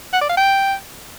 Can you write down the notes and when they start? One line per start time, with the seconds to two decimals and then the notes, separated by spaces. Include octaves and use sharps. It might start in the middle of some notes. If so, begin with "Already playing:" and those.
0.13 F#5
0.22 D5
0.30 F5
0.38 G5